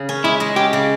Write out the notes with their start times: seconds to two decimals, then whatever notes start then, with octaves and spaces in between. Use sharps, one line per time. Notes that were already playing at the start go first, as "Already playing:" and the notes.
Already playing: C#3
0.09 C#4
0.24 G#3 E4
0.40 G#3
0.56 C#4 G4
0.73 C#3